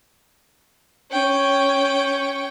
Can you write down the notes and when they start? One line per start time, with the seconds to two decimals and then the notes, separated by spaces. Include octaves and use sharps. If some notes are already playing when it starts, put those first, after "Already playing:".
1.11 C#4 G5